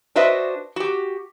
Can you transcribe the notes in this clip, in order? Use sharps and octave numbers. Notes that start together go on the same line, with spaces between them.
D4 F#4 B4 C5 D#5 E5
F#4 G4